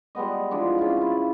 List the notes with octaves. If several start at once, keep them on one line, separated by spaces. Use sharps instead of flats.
G3 G#3 B3 D#5
E3 F3 G#3 D4
C#3 F4
E4 A5